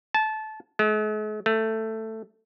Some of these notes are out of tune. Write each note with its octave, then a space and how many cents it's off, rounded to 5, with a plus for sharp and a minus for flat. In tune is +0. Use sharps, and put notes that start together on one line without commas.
A5 -20
G#3 +45
A3 +10